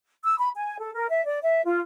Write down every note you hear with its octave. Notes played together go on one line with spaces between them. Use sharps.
E6
B5
G#5
A4
A#4
E5
D5
E5
F4